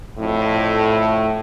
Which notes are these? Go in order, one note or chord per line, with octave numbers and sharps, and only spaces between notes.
F2 A2